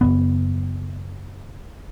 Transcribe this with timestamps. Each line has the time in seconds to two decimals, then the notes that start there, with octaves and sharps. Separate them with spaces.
0.01 F#1 E2 B3